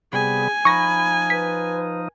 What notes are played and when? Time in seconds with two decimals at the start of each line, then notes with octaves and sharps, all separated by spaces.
0.13 C3 G3 B3 G#4 G#5
0.65 F3 D#4 B5 C#6 A#6
1.30 B4 B6